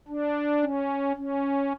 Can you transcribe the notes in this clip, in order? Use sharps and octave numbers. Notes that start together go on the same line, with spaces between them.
D4
C#4
C#4